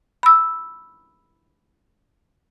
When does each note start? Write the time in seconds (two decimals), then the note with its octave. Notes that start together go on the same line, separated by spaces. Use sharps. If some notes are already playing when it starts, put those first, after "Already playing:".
0.23 B5 E6